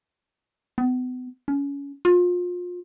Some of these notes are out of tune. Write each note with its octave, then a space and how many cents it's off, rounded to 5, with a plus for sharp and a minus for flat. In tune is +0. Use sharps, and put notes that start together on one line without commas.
B3 +35
C#4 +25
F4 +30